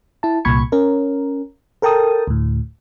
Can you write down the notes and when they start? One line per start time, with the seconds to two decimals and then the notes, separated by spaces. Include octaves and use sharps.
0.23 E4 A5
0.45 C2 A#2 B5 C#6 G#6 C#7
0.72 C#4 A#4
1.82 A4 A#4 G5 A5 D#6
2.27 D2 A2